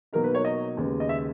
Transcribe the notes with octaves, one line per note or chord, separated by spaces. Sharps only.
B2 F#3 A#3 D#4 A#4
B4
C#5
D#5
D#2 C#3 G#3 B3
D#5
E5